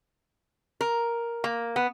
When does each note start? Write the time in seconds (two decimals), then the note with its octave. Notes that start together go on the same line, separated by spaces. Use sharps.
0.81 A#4
1.44 A#3
1.76 B3